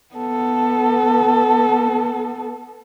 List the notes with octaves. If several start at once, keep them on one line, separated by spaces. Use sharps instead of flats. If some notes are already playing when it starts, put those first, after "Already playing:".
B3 A4